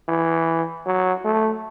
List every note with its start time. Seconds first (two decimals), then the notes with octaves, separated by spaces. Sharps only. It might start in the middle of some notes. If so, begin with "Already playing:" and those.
0.08 E3
0.86 F#3
1.25 A3